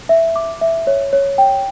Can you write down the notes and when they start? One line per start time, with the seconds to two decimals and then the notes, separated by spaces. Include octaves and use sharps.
0.09 E5
0.36 D6
0.61 E5
0.87 C#5
1.13 C#5
1.38 G5